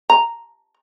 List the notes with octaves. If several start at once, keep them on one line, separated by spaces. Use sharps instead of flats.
A#5